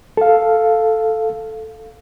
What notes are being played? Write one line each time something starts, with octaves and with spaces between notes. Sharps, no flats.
A4 F5